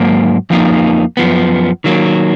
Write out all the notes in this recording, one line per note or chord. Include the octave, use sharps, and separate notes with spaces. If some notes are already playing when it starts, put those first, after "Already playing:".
Already playing: G#2 F#3 A#3
F2 F3 A#3 D#4
F#2 F3 B3
D#3 F#3 A#3